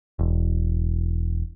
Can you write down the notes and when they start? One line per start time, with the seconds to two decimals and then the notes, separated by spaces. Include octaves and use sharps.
0.19 E1